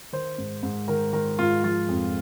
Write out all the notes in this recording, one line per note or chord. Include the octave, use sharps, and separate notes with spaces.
D#3 C5
G#2
G#2
D#3 A#4
D#3 A#4
G#2 F4
F3 F4
F2